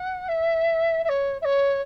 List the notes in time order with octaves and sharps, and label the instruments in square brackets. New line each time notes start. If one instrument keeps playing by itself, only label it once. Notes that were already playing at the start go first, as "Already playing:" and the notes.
Already playing: [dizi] F#5
E5
E5
C#5
E5
C#5